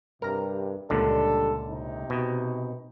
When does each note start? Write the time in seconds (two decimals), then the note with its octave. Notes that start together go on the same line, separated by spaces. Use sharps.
0.22 G2 C3 A#4 A#5
0.90 C#2 A#2 D3 G3 D4 A4
1.70 C3 D#4
2.10 B2